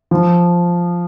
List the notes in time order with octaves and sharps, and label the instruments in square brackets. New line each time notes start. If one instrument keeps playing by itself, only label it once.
[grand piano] F3